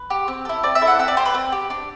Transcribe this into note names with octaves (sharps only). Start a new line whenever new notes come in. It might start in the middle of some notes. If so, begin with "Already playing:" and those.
Already playing: B4
G4
C4
E4 A4
C4 D5
E5
E4 A4
F#5
C4 E5
D5
G4 C5
B4
C4
G4
D4